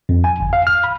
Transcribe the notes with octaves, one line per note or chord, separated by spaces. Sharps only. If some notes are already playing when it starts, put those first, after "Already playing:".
F2
G#5
G1
F5
F6
B5